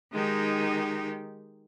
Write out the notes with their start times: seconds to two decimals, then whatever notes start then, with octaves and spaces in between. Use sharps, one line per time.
0.13 D#3 G#3 D#4 G4